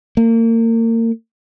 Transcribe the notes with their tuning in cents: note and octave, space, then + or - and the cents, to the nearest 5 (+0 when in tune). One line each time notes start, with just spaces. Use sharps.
A#3 -35